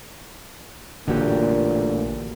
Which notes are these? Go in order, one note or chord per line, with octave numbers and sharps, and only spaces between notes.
A1 A#2 D3 A#3 F#4 G4